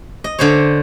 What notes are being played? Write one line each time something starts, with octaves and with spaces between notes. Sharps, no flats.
D#5
D3 C5 C#5